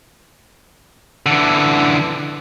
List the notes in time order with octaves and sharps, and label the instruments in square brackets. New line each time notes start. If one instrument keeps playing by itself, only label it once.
[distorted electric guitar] D3 E3